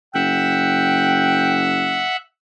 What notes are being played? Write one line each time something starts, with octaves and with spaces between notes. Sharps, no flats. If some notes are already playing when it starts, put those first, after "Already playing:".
F#1 E5 F#5 G5